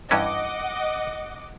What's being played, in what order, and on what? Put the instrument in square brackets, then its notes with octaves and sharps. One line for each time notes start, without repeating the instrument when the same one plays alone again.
[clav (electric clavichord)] G2 E3 C#4 [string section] D#5 F#5 D6